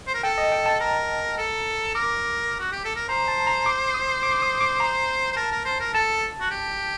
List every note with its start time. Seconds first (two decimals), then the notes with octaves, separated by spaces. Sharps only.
0.07 C5
0.14 A#4
0.23 A4 G5
0.38 D#5
0.52 G5
0.66 A5
0.80 A#4 A#5
1.38 A4
1.94 A#4 D6
2.60 F#4
2.72 G4
2.85 A4
2.96 A#4
3.09 C5 A#5
3.28 A5
3.47 A#5
3.66 D6
3.94 D#6
4.23 D6
4.42 D#6
4.61 D6
4.80 A#5
5.32 C5
5.36 A#4 A5
5.52 A#4
5.65 C5
5.80 A#4
5.94 A4 A5
6.40 F#4
6.51 G4